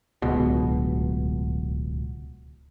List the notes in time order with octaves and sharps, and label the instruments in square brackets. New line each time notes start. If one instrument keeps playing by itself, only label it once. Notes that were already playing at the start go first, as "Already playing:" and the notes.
[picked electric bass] D1 C#2 B2